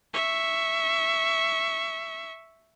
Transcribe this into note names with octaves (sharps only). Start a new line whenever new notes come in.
E5 C#6